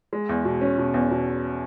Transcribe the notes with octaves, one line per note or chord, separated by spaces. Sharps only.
G#3
E2
B2
C#4
B2
E2
B2